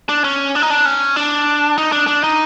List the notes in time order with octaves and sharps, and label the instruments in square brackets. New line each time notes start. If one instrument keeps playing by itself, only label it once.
[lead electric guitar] D4
C#4
D4
D#4
D4
C#4
D4
D#4
D4
D4
D#4